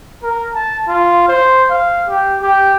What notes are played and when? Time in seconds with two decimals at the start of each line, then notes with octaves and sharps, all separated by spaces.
0.23 A#4
0.54 A5
0.88 F4
1.28 C5
1.70 F5
2.09 G4
2.41 G4